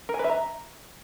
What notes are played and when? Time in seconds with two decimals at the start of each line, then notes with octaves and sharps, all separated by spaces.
0.09 A#4
0.14 G#5
0.19 B4
0.24 E5
0.30 A#5